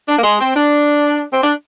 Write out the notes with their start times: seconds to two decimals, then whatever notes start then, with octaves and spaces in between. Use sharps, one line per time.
0.08 D4
0.18 A#3
0.23 G#3
0.39 C4
0.55 D4
1.32 C4
1.42 D4